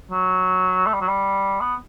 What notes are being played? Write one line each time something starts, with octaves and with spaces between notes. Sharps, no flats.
F#3
A3
G3
F#3
G3
B3